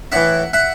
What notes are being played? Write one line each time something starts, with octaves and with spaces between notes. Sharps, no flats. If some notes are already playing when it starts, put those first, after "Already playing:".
A2 E3 E5 F#5
E5 F#5